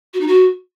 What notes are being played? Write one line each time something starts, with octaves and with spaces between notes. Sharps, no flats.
F#4
D#4
F#4